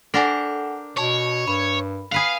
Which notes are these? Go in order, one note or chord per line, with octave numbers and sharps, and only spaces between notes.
D4 A4 A#4 C5 F#5 G#5
B2 C#5 A5 C#6
G2 B5
G#4 B4 F5 F#5